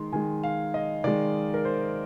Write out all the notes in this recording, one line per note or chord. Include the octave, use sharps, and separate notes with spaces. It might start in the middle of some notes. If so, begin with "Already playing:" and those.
Already playing: D#3 G#3 C6
D#3 G#3 G#5
F5
D#5
D#3 G#3 D5
A#4
C5